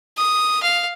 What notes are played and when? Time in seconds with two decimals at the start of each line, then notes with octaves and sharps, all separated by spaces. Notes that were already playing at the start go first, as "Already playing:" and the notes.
0.18 D#6
0.63 F5